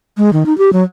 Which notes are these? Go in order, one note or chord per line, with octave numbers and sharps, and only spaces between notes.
G#3
D#3
D#4
G4
F#3